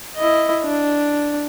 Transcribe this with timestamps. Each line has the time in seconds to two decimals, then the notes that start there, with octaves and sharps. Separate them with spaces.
0.16 E4 D#5
0.63 D4